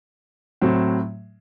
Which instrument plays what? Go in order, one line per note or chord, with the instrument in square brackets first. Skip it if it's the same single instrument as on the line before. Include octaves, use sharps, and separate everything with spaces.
[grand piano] A2 F#3 C4